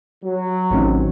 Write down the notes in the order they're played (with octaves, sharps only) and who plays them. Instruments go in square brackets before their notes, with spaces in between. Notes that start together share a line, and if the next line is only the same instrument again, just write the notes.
[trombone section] F#3
[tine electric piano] A1 A2 [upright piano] D#3 C4 C#4